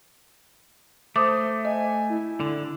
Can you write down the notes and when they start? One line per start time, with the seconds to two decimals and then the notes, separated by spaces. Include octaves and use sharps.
1.16 A3 C5 D6 D#6
1.65 D#5 G#5
2.10 E4
2.40 D3